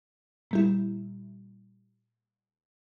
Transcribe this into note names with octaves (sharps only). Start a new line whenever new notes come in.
A#2 G3 E4